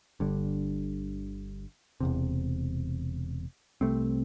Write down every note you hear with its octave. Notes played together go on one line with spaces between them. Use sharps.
G1 G2 D3
E1 E2 C3
C2 C3 A3 C4